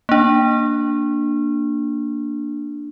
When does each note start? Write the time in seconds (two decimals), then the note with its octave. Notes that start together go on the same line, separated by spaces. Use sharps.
0.09 A#3 D4